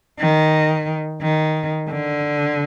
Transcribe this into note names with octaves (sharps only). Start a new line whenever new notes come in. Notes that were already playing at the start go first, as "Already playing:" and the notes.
D#3
D#3
D3